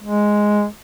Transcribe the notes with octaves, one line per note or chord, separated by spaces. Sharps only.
G#3